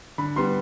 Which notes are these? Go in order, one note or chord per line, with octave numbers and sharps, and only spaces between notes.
D3 B5
G3 B3 C6